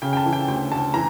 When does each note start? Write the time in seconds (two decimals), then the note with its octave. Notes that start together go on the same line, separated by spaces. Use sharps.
0.02 C#3 G5
0.13 G5
0.17 A5
0.26 E3
0.33 G5
0.48 D2 G5
0.71 D2 A5
0.94 E3 A#5